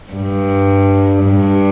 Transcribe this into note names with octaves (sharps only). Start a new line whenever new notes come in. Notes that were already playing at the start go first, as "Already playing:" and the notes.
G2
G2